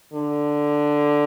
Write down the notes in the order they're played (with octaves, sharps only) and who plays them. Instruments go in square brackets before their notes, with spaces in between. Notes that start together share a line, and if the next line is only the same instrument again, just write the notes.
[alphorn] D3